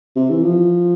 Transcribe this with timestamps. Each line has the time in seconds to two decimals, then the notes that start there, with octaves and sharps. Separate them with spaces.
0.16 C3
0.30 E3
0.43 F3